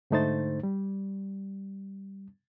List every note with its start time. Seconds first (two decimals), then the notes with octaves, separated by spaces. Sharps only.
0.11 G#2 D3 A3 D#4 C5 A6
0.63 G3